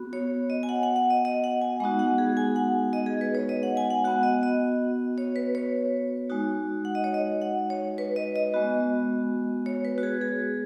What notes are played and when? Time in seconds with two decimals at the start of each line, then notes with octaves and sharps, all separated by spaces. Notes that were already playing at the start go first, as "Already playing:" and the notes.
Already playing: B3 F#4
0.13 C#5
0.50 D#5
0.63 G#5
0.69 F#5
0.83 F#5
0.96 F#5
1.10 D#5
1.25 D#5
1.44 F#5
1.61 G#5
1.80 G#3 B3 D#4 F#4 F#5
1.99 F#5
2.18 G#4
2.37 G#5
2.56 F#5
2.93 D#5
3.06 G#4
3.21 B4
3.35 C#5
3.49 D#5
3.63 F#5
3.77 G#5
3.90 F#5
4.04 B3 F#4 F#5
4.23 D#5
4.43 D#5
5.18 C#5
5.36 B4
5.55 C#5
6.30 G#3 D#4 F#4
6.85 F#5
6.95 D#5
7.04 C#5
7.14 D#5
7.42 F#5
7.70 C#5
7.98 B4
8.16 D#5
8.36 D#5
8.54 G#3 B3 F#4
9.66 C#5
9.85 B4
9.98 F#4
10.03 G#4
10.21 G#4